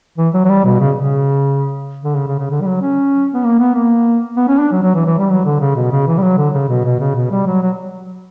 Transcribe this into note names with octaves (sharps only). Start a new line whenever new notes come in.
E3
F#3
F#3
G3
B2
C#3
C#3
D3
C#3
C#3
C#3
D3
G3
F#3
C#4
B3
A#3
B3
A#3
B3
C#4
D4
F#3
F#3
E3
E3
G3
F#3
D3
C#3
B2
C#3
E3
G3
F#3
D3
C#3
B2
B2
C#3
B2
G3
F#3
F#3